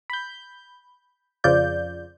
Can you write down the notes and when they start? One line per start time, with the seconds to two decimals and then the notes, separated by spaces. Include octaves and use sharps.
0.10 B5 G6
1.44 F2 C#3 F3 F4 D5 G6